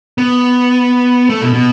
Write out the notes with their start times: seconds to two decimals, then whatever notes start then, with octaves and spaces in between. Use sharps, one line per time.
0.18 B3
1.30 A3
1.41 B2
1.54 B2